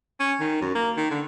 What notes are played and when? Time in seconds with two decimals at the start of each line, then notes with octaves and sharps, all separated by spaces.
0.20 C#4
0.40 D#3
0.61 F#2
0.75 A#3
0.97 D#3
1.11 D3